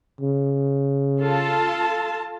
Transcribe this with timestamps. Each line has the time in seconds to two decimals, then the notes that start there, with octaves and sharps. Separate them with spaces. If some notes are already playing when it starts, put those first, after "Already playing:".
0.21 C#3
1.20 F4 A4 A5